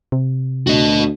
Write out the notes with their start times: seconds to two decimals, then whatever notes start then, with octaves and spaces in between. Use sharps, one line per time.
0.12 C3
0.67 D2 F#4 D#5